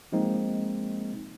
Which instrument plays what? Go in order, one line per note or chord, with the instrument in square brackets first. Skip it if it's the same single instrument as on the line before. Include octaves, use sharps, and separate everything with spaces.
[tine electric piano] F3 G#3 A#3 C4 D#4